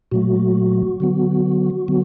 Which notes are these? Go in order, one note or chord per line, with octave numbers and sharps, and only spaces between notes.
A#2 F#3 A3 F#4
D3 F#3 B3
D3 F#3 B3